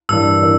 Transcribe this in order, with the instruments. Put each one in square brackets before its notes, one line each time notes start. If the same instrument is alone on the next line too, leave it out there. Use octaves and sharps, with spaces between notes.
[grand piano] G2 E3 A#3 D4 [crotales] E6
[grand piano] E3 A#3 D4